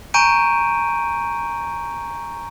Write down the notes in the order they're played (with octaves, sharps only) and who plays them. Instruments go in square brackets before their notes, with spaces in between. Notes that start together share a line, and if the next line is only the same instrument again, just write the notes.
[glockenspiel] G#5 A#5 C#6 G6 D7 D#7